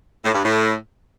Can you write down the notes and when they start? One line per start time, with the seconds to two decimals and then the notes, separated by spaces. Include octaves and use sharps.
0.25 A2
0.34 G2
0.43 A2